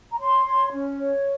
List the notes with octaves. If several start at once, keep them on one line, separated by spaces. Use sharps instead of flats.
A#5
C#5 C6
C#5
C#4
C#5